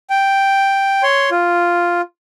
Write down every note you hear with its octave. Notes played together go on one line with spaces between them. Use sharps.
G5
C#5 C6
F4